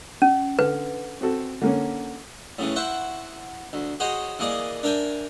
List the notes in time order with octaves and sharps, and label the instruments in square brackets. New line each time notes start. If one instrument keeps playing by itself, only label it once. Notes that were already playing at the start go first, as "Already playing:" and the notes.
[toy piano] C#4
[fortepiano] D3 [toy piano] B4
[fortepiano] C4 F#4 A4
D3 A#3 C#4
[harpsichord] A2 C#3 E3
E4 C5 E5 F#5 C#6
D2
F#4 G#4 C5 C#5 D#5
E3 A#3 G#4 D5 D#5
D4 A#4 E5 G5 G#5